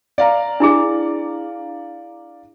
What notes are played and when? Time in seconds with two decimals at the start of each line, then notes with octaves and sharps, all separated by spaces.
0.18 D5 F5 A#5
0.60 D4 E4 G#4